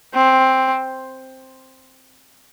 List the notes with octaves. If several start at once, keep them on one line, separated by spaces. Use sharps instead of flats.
C4